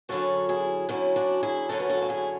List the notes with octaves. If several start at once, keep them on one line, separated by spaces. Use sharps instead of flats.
F#2 D3 F#3 C#4 F#4 A4
E4 G#4
F#2 D3 F#3 C#4 E4
D4 F#4
E4 G#4
F#2 D3 F#3 C#4 F#4 A4
B4
F#4 A4
F#4
E4 G#4